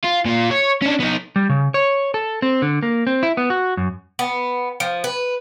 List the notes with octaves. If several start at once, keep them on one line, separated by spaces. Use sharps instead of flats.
F4
A#2 F4
C#5
C#4 D4
B3 D#4
G3
C#3
C#5
A4
C4
D3
A#3
C4
E4
B3
F#4
F#2
B3
F3
B4